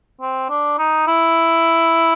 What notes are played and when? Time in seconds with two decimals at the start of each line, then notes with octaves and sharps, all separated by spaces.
0.21 C4
0.49 D4
0.78 D#4
1.07 E4